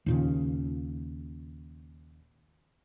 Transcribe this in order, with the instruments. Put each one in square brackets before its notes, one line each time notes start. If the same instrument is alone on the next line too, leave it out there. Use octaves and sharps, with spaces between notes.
[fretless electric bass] D#2 A#2 C#3